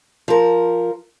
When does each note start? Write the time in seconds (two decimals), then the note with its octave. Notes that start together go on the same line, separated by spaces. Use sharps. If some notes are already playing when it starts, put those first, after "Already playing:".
0.28 F3 A#4